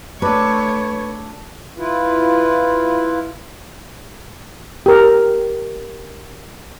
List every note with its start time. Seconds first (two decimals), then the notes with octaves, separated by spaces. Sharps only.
0.22 A3 D4 B4 C#5 E6
1.78 E4 F4 B4
4.86 G4 A#4